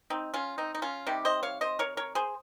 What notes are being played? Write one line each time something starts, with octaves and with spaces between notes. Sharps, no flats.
C4 D#4
C#4 F4
C4 D#4
D#4
C#4 F4
C3 D#3 G3 G4
C5 D#5
C#5 F5
C5 D#5
A#4 C#5
A#4 C#5
G#4 C5